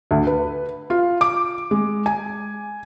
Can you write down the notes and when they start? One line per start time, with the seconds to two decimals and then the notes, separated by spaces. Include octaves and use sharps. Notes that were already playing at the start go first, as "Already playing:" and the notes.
0.11 D2
0.27 B4
0.90 F4
1.21 D6
1.71 G#3
2.06 G#5